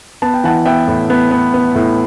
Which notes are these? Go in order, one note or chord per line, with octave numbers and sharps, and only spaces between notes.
B3 A5
G5
E3 F#5 A5
B3 E5 G5
A2
B3
B3
B3
A2